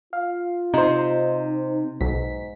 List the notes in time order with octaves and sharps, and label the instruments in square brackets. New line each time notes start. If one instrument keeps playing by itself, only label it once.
[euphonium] F4 [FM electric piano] F5
[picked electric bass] C3 [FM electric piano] D#4 C5
[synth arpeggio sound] B1 [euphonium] G#2 [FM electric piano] B6